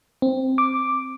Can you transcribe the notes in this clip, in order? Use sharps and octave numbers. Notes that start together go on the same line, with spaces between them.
C4
D6